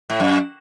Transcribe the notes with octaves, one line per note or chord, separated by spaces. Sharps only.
A2
F#2